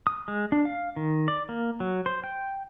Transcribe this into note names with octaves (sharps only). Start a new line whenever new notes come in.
D#6
G#3
D4
F5
D#3
D5
A#3
F#3
C5
G5